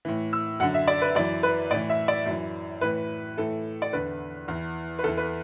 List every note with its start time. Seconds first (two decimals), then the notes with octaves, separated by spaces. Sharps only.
0.05 A2 E3
0.33 E6
0.60 F#2 D3 F#5
0.74 E5
0.88 D5
1.02 B4
1.15 F#2 E3 D5
1.43 B4
1.71 A2 D5
1.75 E3
1.90 E5
2.08 D5
2.26 F#2 E3
2.81 A2 E3 B4
3.37 A2 E3 A4
3.82 D5
3.93 E2 D3 B4
4.48 E2 E3
4.99 B4
5.04 E2 A4
5.07 E3
5.17 B4